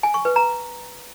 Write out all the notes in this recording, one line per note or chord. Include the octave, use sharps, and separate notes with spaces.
G#5
C#6
B4
A#5